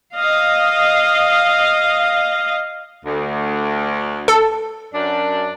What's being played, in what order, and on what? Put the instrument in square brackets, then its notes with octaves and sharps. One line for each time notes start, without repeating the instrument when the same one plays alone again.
[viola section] D#5 F5
[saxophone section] D2
[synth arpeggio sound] A4
[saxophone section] F#2 D4